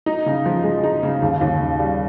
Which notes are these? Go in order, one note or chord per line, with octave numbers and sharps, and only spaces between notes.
D#4
C#3
F3
G#3
D#4
C#3
D#2
D#2
C#3
G3